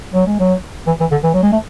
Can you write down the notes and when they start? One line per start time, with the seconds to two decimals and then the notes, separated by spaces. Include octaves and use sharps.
0.14 F#3
0.26 G#3
0.39 F#3
0.87 E3
1.00 E3
1.11 D3
1.24 E3
1.34 F#3
1.43 G#3
1.52 A3